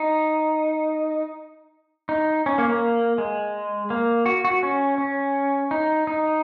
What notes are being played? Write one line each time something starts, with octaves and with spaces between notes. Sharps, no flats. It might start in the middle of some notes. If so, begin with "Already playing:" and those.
Already playing: D#4
D#4
C#4
A#3
A#3
G#3
A#3
F#4
F#4
C#4
C#4
D#4
D#4